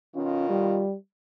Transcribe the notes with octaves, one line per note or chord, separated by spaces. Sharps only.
B2 D#3 C#4 F4
G3